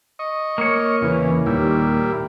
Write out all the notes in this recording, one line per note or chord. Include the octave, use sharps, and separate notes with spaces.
D#5 C#6
A#3 C#5
E2 C#3 E3
D#2 A#2 G3 E4